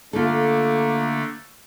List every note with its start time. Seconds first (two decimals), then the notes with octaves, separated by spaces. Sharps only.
0.13 D3 A3 A#3 F4 A4